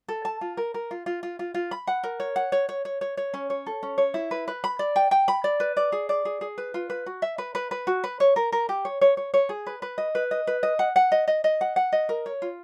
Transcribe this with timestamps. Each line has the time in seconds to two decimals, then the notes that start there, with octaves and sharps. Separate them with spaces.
0.08 A4
0.25 A5
0.41 F4
0.57 A#4
0.74 A#4
0.91 F4
1.06 F4
1.23 F4
1.39 F4
1.54 F4
1.71 B5
1.87 F#5
2.03 A#4
2.20 C#5
2.36 F#5
2.52 C#5
2.69 C#5
2.85 C#5
3.01 C#5
3.17 C#5
3.34 C#4
3.50 C#5
3.66 A4
3.83 C#4
3.98 C#5
4.14 E4
4.31 B4
4.48 B4
4.64 B5
4.79 D5
4.96 G5
5.11 G5
5.28 B5
5.44 D5
5.60 B4
5.77 D5
5.92 G#4
6.09 D5
6.25 G#4
6.41 G#4
6.58 B4
6.74 F4
6.90 B4
7.06 F#4
7.22 E5
7.38 B4
7.55 B4
7.71 B4
7.87 F#4
8.04 B4
8.20 C#5
8.36 A#4
8.52 A#4
8.69 G4
8.85 C#5
9.01 C#5
9.17 C#5
9.34 C#5
9.49 G#4
9.67 B4
9.82 B4
9.98 D#5
10.15 B4
10.31 D#5
10.47 B4
10.63 D#5
10.79 F#5
10.96 F#5
11.12 D#5
11.27 D#5
11.44 D#5
11.61 F#5
11.76 F#5
11.92 D#5
12.09 A#4
12.26 C#5
12.42 F4